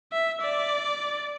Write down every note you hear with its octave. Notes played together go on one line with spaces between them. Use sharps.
E5
D5